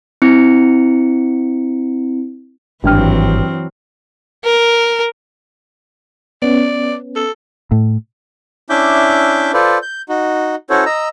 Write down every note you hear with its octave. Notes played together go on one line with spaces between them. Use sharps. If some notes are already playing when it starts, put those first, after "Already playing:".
C4 E4 C#7
G#1 G2 E3 F#3 C4 G5 F6
A#4
B3 C#4 D5
A4
A2
C#4 D4 E4 E5 D6 G6
F4 A4 B4 C5 D5
G6
D#4 F#4
C#4 E4 F#4 A4 C5 C#5
D#5 A#5 E6